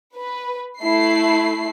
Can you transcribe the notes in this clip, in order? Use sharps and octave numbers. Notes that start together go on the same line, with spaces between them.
B4
A3 E4 C7